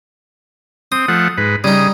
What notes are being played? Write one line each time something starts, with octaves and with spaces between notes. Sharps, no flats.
C4 D#6
F3 A3 F#5
G#2 B4
C#3 G3 D#4 D#6